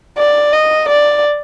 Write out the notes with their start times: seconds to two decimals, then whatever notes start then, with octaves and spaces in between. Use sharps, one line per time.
0.17 D5
0.53 D#5
0.90 D5